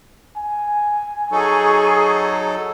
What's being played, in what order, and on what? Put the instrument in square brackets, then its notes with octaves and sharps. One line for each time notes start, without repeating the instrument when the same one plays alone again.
[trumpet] G#5
[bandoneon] F#3 D#4 A4 [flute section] G#4 C#6